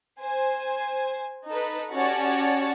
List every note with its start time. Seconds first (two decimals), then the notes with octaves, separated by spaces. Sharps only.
0.19 C5 G#5
1.48 D#4 A4 B4
1.93 C#4 F#4 G4 C#5 D5 A5